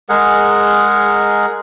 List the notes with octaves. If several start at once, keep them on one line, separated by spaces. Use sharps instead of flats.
G#3 G#4 A#4 F#5